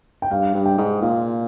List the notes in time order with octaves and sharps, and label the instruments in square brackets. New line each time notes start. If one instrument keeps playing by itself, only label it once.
[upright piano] G5
[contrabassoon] G2 [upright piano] F5
[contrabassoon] G2
[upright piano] G5
[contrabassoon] G#2
[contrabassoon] A#2 [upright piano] F5